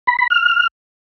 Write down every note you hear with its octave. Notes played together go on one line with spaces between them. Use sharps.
B5
B5
F6